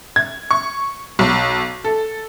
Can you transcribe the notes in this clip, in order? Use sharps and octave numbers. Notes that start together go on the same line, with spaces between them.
G#6
C#6
B1
A4